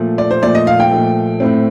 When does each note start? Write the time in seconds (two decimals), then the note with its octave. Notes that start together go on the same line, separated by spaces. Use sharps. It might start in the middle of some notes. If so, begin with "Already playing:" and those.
Already playing: A#2 F3 A3
0.18 D5
0.31 C5
0.42 A#2 F3 A3 D5
0.55 D#5
0.67 F5
0.80 G5
0.91 A#2 F3 A3
1.40 A2 A3 C4